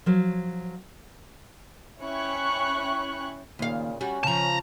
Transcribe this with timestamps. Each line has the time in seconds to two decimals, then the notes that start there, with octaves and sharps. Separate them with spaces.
0.06 F3 F#3 C#5
2.02 C#4 E4 C#5 G5 C#6 F#6
3.59 D#2 A#2 C#3 F5
4.01 G3 C#4 F#4
4.23 C#3 F3 A5 A#5